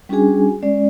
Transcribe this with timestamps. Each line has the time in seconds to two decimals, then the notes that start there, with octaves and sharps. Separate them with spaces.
0.09 G3 C#4 D4 F#4 G#4 G#5
0.63 G#3 C#4 D5